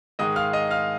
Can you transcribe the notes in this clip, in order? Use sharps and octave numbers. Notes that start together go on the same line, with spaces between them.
G#2 D#3 G#3 D#5 D#6
F5 F6
D#5 D#6
F5 F6